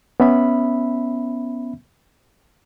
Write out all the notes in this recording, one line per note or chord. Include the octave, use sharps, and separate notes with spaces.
B3 C#4 E5 B5